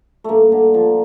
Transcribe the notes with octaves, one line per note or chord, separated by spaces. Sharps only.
G2 A3 A#3
D3
F3